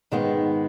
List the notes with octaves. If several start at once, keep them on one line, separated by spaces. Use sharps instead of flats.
G#2 D#3 G#3 B3